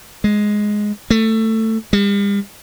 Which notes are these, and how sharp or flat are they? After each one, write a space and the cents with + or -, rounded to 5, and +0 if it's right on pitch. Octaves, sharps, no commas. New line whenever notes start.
G#3 +5
A3 +15
G3 +45